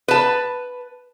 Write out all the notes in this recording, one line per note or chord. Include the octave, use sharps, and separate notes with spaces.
B4 A5